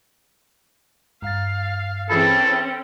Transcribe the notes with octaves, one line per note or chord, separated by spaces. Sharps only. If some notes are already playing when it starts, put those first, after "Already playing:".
G2 F5 A6
E3 C4 C#4 G#4 A4 B5